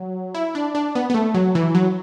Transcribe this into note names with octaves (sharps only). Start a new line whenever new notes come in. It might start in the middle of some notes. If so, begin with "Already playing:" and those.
Already playing: F#3
E4
D4
D4
B3
B3
A3
F#3
E3
F#3